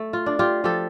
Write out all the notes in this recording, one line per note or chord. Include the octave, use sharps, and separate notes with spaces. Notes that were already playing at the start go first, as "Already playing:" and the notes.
Already playing: A3
F4
D4
F4 G4
F3 G4 A4